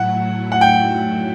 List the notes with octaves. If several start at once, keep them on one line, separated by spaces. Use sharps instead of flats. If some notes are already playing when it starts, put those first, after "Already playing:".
Already playing: A2 F#3 A3 E4 F#5
F#5
G5